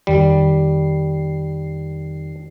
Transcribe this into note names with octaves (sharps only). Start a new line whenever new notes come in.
F2 D#3 G3 C7